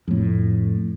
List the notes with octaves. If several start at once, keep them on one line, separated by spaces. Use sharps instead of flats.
F2 A2